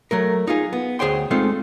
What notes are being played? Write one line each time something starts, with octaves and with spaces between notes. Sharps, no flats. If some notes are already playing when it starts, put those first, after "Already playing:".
F#3 A3 A#4
D#4 F4 G#4
B3
D2 G#4 C5 C#5 G5 C6
G#3 A3 C4 D#4 F4 A4